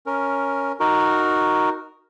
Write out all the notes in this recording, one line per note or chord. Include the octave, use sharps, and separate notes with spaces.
C#4 A#4
D#4 F#4 A#4